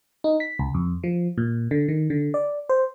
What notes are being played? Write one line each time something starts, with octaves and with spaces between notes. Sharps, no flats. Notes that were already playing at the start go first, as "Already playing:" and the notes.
D#4
B6
C#2
F2
F3
A#2
D3
D#3
D3
D5
C5